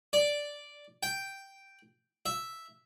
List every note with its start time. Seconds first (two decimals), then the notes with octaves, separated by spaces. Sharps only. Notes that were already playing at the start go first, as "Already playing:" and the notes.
0.13 D5
1.03 G5
2.26 E5